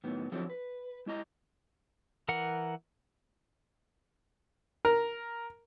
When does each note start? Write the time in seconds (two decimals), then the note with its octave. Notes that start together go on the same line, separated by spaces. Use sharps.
0.04 A2 D#3 F#3 B3
0.32 D3 F3 F#3 C4 E4 A4
0.50 B4
1.06 G#3 E4 D#5 A#5
2.29 E3 A#4 F#5
4.85 A#4